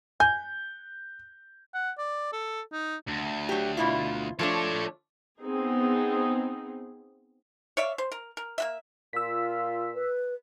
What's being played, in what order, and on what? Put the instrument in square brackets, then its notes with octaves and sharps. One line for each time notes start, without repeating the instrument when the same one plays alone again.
[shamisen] G#5 [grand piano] G6
[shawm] F#5
D5
A4
D#4
[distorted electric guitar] D2
[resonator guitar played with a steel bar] F#3 G4
B2 E4 F4
[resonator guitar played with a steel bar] F3 A3 D4 [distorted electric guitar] A4 C#5
[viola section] B3 C4 D#4 G#4
[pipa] C#5 D5 E5 F5
C5
A#4
A#4
A#3 F#4 E5
[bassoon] A#2 [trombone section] F4 [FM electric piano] E6 B6
[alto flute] B4